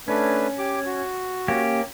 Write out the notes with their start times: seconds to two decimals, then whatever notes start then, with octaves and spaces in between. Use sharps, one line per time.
0.08 A3 C#4 D4 B4
0.58 G4 D6
0.86 F#4
1.48 A#3 C#4 G4